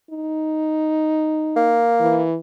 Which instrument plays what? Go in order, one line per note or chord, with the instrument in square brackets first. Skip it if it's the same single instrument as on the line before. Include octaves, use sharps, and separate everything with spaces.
[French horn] D#4
[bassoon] A#3
[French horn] E3